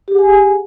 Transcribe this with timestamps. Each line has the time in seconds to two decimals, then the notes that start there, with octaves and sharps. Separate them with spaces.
0.08 G4
0.11 G#4
0.15 F#5
0.19 G#5